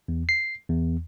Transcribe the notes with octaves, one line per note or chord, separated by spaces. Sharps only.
E2
C7
E2